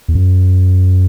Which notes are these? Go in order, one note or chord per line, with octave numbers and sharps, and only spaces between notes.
E2
F#2